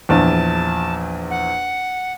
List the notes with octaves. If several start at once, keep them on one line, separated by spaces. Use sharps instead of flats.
A#1 E2 A5
F#5